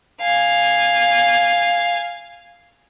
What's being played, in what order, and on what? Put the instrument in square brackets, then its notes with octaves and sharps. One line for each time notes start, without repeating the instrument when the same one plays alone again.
[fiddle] F5 G#5